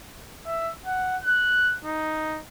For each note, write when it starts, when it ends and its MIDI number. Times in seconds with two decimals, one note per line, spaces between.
0.46 0.70 76
0.86 1.16 78
1.23 1.74 90
1.84 2.40 63